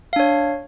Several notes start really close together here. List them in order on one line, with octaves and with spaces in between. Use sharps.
F5 D4 C#5